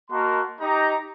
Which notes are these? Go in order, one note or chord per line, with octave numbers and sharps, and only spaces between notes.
A#3 F#4 A#4 D#5 A5 C6
D#4 G4 A#5